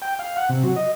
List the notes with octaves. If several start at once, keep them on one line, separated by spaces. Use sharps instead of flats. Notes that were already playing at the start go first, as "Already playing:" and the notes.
G5
F5
F#5
C3
F#3
D#5